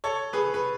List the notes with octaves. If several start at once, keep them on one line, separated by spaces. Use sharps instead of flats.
A4 C#5
G#4 B4
B4